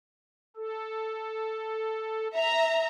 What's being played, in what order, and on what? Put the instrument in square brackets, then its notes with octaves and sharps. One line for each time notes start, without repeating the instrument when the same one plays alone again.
[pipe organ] A4
[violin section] E5 A#5